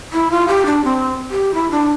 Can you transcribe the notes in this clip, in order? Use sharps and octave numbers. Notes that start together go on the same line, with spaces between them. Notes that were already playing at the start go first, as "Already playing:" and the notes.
E4
F4
G4
D4
C4
G4
E4
D4